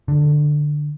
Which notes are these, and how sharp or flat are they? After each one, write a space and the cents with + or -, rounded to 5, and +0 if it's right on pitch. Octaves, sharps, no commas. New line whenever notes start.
D3 +10